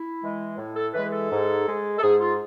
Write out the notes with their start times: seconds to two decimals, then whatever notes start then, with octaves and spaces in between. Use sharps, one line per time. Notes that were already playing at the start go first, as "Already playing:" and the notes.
Already playing: E4
0.21 E3 G#3
0.58 A2
0.75 A4
0.94 E3 G#3 B4
1.12 A4
1.31 G#2
1.66 G#3
1.99 A4
2.03 G#2 G#4
2.21 F4